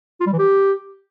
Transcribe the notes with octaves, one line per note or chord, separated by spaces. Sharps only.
F4
G3
E3
G4